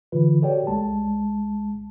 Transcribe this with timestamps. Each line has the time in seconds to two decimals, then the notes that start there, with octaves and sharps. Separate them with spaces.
0.12 D3 E3 F4 B4
0.42 F#4 G4 A4 C#5 D5 G5
0.67 B1 G#3 A5